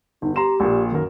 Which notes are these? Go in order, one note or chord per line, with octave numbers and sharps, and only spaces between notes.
G1 D#4
G4 A#5 C6 E7
A#1 A#2
F#2 D#3 A#4